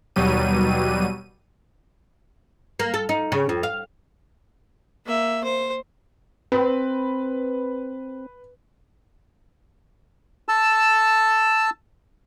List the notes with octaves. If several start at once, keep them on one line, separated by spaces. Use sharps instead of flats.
D#2 B2 F#3 G3 D#7
A#3
A4
D#4
C#3
F2
F5
A#3 E5
C5
C4 B4
A5 E6